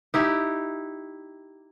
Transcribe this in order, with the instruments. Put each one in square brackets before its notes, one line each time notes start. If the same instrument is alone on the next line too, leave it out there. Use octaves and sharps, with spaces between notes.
[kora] D#4 E4 G4